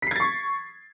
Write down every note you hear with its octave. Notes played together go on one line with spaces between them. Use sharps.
C#6 G#6 A6 B6 C7